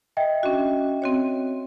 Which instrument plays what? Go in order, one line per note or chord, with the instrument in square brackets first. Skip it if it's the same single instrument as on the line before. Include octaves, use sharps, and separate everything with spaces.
[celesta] D#5 E5 G5
[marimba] C#4 D4 F#4
C4 F#4 C#5